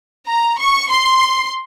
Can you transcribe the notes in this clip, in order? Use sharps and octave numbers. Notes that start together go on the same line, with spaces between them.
A#5
C#6
C6